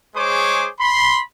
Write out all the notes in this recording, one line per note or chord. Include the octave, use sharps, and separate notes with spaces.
G#3 G#4 C5 C#5 C#6 D6
B5 C6